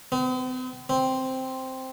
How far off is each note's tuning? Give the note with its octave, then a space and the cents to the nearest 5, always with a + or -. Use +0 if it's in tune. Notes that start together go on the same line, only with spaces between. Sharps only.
C4 -45
C4 +0